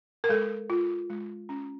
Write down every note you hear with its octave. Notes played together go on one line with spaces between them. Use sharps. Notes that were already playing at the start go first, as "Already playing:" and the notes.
A#4
G#3 A4
F4
G#3
C#4